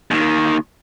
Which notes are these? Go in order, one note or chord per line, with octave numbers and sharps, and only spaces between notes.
D#2 D#3